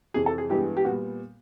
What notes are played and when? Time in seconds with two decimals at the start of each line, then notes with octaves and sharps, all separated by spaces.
0.14 F2 C3 E3 G#4
0.26 A4
0.38 G#4
0.49 G2 E3 G#3 B3 G4
0.77 G4
0.84 A#2 G3 B3 F#4